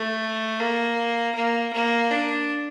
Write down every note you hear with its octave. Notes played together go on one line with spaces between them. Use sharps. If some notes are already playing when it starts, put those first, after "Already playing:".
Already playing: A3
A#3
A#3
A#3
D4